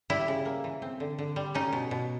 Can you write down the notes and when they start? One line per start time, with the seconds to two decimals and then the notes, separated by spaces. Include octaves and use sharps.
0.10 G3 E4
0.28 C#3
0.45 A#3
0.64 E3
0.82 C4
1.00 D3
1.19 D3
1.36 G3
1.55 C#4 D#4
1.73 B2
1.91 B2